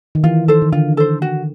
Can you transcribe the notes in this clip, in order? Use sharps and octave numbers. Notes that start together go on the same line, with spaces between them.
D#3
E3 F4
D#3 A4 C5
D#3
D3 F4
A4 C5
F#4